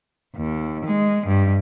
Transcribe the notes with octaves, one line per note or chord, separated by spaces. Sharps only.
D#2
G#3
G2